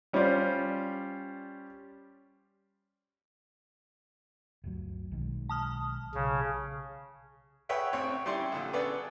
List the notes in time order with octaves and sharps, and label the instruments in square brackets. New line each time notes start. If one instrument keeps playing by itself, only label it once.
[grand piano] G3 C#4 F4 C5 D5
[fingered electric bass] G1 D2 F#3
B1 D#3 G#3
[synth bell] A5 D#6 F6
[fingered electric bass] B1 [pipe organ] C#3
[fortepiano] G#4 B4 C#5 E5 F#5 G5
A1 C4 C#5 C#6
G3 C#4 E4 G4 D5 C6
A#1 D3
B3 C#4 G#4 A4 B4 D5